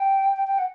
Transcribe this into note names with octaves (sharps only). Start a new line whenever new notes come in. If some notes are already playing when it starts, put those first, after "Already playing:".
Already playing: G5
G5
G5
F#5